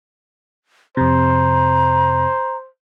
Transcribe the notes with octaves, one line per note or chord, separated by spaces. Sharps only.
F2 C3 C5 A#5